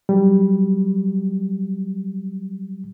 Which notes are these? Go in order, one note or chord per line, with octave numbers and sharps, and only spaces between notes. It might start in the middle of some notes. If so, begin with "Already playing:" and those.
F#3 G3